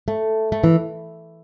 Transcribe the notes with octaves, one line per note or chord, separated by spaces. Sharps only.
A3
A3
E3